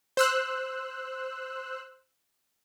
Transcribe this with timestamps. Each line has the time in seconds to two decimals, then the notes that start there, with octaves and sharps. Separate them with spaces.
0.17 C5 E6 F#6